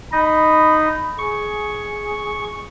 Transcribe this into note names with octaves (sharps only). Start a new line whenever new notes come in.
D#4 D#5 B5
G#4 C#6